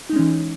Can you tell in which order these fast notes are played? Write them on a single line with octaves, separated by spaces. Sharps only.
D#4 G#3 C#4 E3